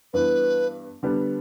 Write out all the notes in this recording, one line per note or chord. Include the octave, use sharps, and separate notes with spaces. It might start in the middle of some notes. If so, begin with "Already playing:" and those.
G2 E3 B3 B4
D3 G3 B3 D4